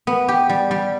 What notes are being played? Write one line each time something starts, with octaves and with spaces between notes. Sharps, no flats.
B3
G4
G3
G3